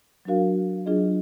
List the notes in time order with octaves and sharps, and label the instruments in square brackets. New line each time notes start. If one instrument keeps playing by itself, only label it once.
[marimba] F#3 D4 F#4 A#4 F5
F#3 D4 F4 G#4 D#5